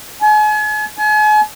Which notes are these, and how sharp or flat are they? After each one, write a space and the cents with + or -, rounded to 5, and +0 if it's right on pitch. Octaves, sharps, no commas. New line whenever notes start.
G#5 +40
G#5 +40